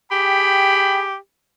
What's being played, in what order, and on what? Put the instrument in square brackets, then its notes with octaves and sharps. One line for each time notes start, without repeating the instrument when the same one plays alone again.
[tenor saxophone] G4 [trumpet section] G#4 G5 B5